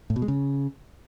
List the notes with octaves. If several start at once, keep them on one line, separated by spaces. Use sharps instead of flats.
A2
B2
G#3
C#3